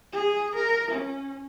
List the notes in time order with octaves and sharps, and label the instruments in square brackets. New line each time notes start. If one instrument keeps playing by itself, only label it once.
[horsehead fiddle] G#4
A#4
C#4